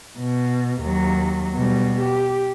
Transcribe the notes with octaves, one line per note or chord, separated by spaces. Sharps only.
B2
D#2 F#3
B2 G3
G4